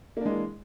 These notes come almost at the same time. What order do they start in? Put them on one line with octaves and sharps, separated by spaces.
A#3 D4 G#3 E3